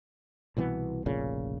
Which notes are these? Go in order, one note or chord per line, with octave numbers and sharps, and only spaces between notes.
C2 B2 E3 B3
F1 A#1 A#2 C#3